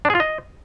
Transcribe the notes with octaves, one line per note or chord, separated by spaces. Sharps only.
D4
G#4
F4
D#5